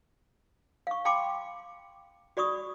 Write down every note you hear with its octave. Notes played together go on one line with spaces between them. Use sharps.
F5 C#6
F5 G5 A5 B5 C6 D6
F#4 D5 B5 C#6 D#6